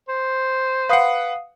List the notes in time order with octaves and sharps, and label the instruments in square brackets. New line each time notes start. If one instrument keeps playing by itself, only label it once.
[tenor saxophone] C5
[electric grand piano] B4 F#5 [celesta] F5 D#6 C7